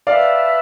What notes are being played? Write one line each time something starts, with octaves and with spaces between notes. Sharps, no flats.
B4 D5 E5 F5 A5